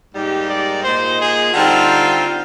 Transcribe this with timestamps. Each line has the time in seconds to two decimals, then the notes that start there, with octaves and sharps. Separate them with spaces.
0.14 G#2 G3 A#3 D#4 G4
0.49 D5
0.84 A#2 G#3 D#4 C5
1.19 G#4
1.54 D3 G3 C4 D#4 F4